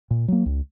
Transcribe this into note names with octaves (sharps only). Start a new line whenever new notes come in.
A#2
F#3 A#3
C#2